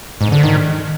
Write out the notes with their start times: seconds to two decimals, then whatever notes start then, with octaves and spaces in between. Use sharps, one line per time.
0.21 G#2
0.32 D3
0.43 D#3